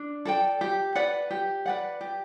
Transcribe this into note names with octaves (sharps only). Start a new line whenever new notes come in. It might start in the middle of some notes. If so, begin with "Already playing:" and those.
Already playing: D4
A4 D5 G5
G4
B4 D5 F#5
G4
B4 D5 F#5
G4